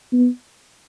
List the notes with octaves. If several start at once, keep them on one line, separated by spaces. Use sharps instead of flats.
B3